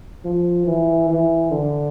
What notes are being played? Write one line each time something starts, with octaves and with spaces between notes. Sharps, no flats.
F3
E3
E3
D3